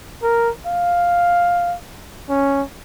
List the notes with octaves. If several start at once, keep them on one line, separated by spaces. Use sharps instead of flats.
A#4
F5
C#4